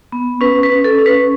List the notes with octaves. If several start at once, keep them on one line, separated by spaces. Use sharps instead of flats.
B3
C#4 B4
B4
C#4
A4
C#4
B4